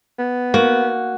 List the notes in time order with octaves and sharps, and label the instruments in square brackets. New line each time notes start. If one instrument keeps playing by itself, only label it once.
[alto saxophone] B3
[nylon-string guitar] A#3 [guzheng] F#4